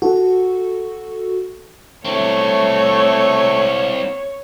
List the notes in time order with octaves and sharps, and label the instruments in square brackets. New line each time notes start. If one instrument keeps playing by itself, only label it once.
[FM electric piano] F#4 A4
[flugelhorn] A3 [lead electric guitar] C4 E4 [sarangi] C#5